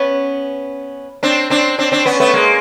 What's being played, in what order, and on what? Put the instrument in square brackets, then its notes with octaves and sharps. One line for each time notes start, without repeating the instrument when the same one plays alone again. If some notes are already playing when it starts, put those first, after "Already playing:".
Already playing: [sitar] B3 C#4
C4 D4
C4 D4
C4 D4
C4 D4
B3 C#4
A3 B3
G#3 A#3